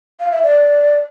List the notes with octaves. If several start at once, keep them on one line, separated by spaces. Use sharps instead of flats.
F5
E5
D5